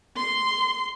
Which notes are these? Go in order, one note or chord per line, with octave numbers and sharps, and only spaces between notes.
C6